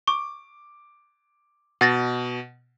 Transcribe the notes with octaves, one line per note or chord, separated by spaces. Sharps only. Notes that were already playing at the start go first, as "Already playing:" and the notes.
C#6 D6
B2 F#5 A6 A#6